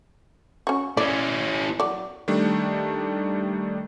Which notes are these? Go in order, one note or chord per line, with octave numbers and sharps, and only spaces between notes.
C#4 F#4
C#4 E4 D5
F#3 D5
D#3 G3 A3 D4